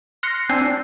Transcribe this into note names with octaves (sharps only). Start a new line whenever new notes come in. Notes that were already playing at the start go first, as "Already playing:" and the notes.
C6 F6 F#6 A#6 C7 C#7
C4 D4 G#5 E6 G6 C7
D4